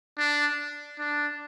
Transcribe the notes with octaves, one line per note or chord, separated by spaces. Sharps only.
D4
D4